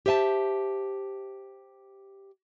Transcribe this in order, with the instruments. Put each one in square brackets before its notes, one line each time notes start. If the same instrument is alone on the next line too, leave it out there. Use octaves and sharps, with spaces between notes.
[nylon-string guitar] G4 C5 E5 G#5 A5